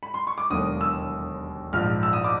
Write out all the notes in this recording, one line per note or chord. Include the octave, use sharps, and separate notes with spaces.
B5
C6
C#6
D6
E1 D#2 D3 F#3 A#3 D#6
E6
A#1 G#2 F3 F6
E6
D#6
D6